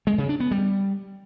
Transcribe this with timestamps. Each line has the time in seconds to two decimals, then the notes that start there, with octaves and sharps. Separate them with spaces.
0.07 G#3
0.18 C#3
0.29 D4
0.40 B3
0.51 G3